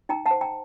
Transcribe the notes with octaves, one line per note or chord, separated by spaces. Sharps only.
D#4 G5 A#5
F#5 A5
C5
G5 A#5